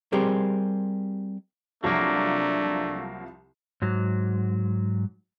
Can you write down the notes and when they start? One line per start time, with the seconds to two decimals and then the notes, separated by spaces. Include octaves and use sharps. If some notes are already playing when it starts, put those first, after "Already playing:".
0.12 G3 C4 G4 G#4 A#4
1.84 C2 F3 F#3 A3 A#3 D4
3.82 G#2 F#3